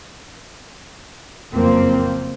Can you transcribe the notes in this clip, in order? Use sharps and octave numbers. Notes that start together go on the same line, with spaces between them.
F#1 F2 F3 A#3 C4